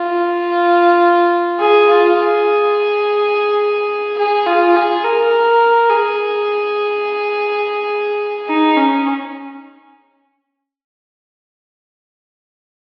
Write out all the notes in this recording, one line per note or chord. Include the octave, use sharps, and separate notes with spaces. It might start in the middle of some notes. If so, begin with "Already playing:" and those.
Already playing: F4
G#4
F4
G#4
G#4
F4
G#4
A#4
G#4
D#4
C#4